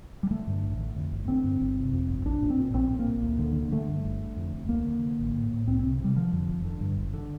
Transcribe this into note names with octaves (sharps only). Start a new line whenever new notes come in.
G3
D3 A3
G2
A1
D3
F2
G1
D3 C4
G2
G1
C3
F2
G1
A#1 D4
A#2
C4
A#2
A#1 C4
A#2
A#3
A#2
D2
D3
D3
D3 A3
G2
G1
D3
F2
F1
D2 A#3
D3
D3
A1
A2
A2
C2 C4
C3 C4
C3 G3
D3 F3
F2
F1
D3
G2
G1
D3